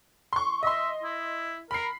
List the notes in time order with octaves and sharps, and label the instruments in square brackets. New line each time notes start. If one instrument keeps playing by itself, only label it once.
[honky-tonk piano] C6 C#6
[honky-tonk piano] D#5 C6 [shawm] E5
[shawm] E4
[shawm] A#4 [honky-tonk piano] B5 C7